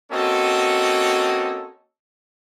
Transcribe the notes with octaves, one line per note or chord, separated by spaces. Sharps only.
A#3 C4 C#4 F#4 A4 D#5